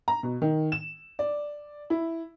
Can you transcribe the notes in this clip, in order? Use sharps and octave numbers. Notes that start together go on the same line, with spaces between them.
A#5
B2
D#3
E7
D5
E4